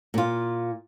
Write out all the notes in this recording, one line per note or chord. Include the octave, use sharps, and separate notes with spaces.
A#2 F4